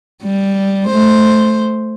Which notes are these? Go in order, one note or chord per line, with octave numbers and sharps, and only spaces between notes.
G3
A3 C5